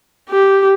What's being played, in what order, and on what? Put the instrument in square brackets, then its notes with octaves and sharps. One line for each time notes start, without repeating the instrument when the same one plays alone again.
[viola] G4